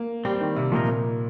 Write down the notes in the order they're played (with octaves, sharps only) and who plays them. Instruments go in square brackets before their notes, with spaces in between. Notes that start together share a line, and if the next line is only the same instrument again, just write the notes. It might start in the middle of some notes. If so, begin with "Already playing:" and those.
Already playing: [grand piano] A#3
[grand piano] G3 [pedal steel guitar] C4 G4 C5
[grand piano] D#3
C3
[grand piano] A#2 [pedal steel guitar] F3 A#3 D#4 A#4